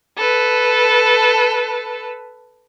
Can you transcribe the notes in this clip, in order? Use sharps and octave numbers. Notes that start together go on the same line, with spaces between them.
A4 B4